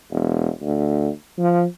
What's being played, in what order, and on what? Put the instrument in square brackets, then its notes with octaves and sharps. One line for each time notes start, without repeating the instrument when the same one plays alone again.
[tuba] E1
D2
F3